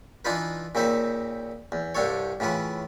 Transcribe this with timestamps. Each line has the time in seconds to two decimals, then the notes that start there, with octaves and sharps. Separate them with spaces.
0.25 E3 D4 D#4 F4 B4
0.75 A#2 C#3 C4 D#4 E5
1.72 E2
1.95 C2 G2 D4 A4 C#5
2.40 A2 C#3 E3 F4 B4